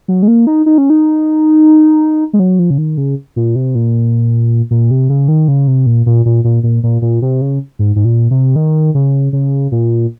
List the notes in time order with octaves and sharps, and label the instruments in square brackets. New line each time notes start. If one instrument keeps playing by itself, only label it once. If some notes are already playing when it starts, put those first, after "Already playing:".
[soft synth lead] F#3
G#3
A#3
D#4
D#4
C#4
D#4
G#3
F#3
F3
C#3
D#3
C#3
A#2
C3
A#2
A#2
C3
C#3
D#3
C#3
C3
A#2
A#2
A#2
A#2
A#2
A#2
A#2
C3
C#3
G#2
G#2
A#2
C3
D#3
C#3
C#3
A#2